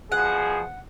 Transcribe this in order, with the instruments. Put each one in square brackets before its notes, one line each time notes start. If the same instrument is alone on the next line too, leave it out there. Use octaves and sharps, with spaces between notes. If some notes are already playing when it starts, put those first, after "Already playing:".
[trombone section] B2 F3 G#4 [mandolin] F#5